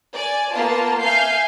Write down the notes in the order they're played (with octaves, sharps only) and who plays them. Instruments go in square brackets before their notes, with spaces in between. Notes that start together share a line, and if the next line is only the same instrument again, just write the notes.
[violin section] D5 G#5
A#3 B3 F4 A5
E5 F5 G#5 G6 C7